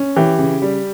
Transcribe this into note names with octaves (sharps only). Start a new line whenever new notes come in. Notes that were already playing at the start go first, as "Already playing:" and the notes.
Already playing: C#4
E3 G4
C#3
G3